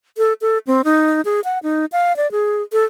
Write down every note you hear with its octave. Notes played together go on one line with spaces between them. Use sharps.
A4
A4
C4
D#4
G#4
F#5
D#4
F5
D5
G#4
A4